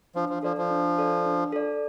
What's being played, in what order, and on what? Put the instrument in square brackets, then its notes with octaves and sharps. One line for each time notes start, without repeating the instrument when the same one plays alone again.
[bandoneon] F3 [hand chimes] D4
[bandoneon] F3
[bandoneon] F3 [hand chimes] A4 D5
[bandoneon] F3
[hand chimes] D4
A4 D5
D4
A4 D5